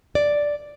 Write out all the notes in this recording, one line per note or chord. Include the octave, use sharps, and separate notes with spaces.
D5